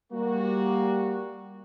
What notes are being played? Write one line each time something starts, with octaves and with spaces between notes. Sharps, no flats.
G3 A#3 F#4